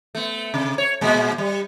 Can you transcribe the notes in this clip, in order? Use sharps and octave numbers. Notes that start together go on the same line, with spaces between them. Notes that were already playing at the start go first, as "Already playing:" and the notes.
A3 B3
C3
C#5
A#2 G#3
G3